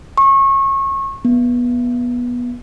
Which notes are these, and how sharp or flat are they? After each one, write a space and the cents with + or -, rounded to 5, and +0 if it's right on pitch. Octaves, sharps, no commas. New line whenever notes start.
C#6 -30
B3 -20